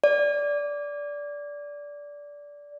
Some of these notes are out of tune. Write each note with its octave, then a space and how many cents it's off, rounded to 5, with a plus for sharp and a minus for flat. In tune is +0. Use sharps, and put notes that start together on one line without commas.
D5 -15